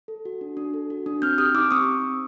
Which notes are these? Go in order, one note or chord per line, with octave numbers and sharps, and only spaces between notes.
A4
F#4
D4
D4
A4
F#4
D4
C4 F6 G6
G4 D#6 F6
D#4 D6 E6
C4 C#6 D#6